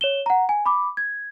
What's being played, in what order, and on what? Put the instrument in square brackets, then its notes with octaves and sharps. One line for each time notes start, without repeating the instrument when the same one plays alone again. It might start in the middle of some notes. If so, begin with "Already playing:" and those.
[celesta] C#5 E7 G7
F#5 A#5
G#5
B5 D6
G#6